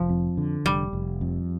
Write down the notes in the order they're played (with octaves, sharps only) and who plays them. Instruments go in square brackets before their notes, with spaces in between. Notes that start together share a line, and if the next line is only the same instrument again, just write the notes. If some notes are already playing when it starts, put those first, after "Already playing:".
Already playing: [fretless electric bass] F1 [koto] F3
[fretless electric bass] F2
D3
[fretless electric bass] F1 [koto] G3
[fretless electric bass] F1
F2